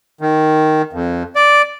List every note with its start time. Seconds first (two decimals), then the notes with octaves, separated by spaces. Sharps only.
0.21 D#3
0.93 F2
1.36 D5